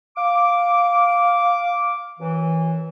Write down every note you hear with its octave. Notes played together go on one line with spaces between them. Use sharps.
F5 D6
F#2 E3